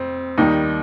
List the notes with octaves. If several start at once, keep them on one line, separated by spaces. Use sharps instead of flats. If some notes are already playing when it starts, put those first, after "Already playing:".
Already playing: F2 C4
D#2 D#3 G3 D#4